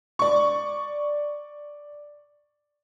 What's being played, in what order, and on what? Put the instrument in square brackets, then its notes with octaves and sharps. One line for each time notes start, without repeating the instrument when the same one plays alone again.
[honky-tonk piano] D5 C#6